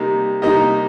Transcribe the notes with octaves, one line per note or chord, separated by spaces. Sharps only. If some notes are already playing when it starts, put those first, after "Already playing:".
Already playing: C3 G3 A#3 D#4
C3 G3 A#3 D#4 D#5